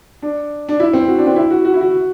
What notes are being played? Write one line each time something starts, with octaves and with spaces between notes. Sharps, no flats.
D4
D4
E4
C4
F#4
D4
C4
E4
F#4
F#4
E4
F#4